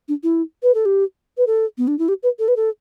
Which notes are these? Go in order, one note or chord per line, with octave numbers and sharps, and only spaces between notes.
D4
E4
B4
A4
G4
B4
A4
B3
D4
E4
G4
B4
A4
B4
A4